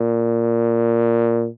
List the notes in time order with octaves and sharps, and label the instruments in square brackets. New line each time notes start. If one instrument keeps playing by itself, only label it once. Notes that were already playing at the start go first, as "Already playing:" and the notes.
Already playing: [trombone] A#2